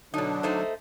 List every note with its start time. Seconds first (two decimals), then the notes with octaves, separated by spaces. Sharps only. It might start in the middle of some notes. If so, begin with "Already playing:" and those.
0.14 B2 D3 F#3 D4 D#4
0.43 A3 D#4 C5